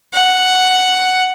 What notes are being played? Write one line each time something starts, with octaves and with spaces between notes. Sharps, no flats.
F#5